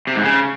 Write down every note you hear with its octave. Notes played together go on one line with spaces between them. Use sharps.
C3
G#2
C#3